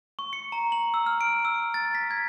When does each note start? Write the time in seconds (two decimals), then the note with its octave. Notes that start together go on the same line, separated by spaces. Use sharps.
0.19 C#6
0.33 C#7
0.52 A#5
0.72 F#7
0.94 E6
1.06 F6
1.21 D7
1.45 E6
1.74 A6
1.95 B6
2.11 G#6